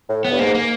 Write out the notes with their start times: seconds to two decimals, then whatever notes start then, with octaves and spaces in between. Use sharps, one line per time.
0.09 A2
0.24 A2 B3
0.32 G2
0.39 G#2 A#3
0.55 A#3